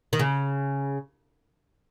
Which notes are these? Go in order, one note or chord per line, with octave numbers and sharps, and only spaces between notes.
D#3
C#3